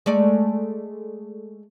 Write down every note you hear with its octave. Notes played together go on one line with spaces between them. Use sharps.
G#3 A3 D5